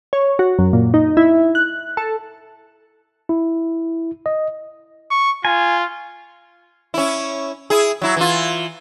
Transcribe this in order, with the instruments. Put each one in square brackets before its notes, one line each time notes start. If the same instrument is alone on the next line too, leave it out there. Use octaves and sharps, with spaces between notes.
[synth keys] C#5
F#4
F#2
A#2
D#4
E4
F#6
A4
[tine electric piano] E4
D#5
[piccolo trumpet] C#6
[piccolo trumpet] F4 [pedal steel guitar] G#5
[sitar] C#4 E4
E4 G#4
F#3 E4
E3 F4